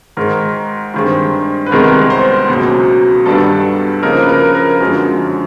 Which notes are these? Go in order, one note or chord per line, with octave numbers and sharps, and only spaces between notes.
G#2 D#3 G#3 A#4
G2 D#3 G#3 C4
B4
C2 C3 D#3 G#3 B3 A#4
C5
C#2 B2 F#3 A#3
G2 D#3 G3 B3 D4 A4
C#3 F3 A#3 D#4 A#4
B4
A#4
A#4
F#2 D3 F3 G#3 C4